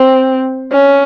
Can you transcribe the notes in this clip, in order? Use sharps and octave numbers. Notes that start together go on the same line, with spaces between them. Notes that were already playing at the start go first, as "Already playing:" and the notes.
Already playing: C4
C#4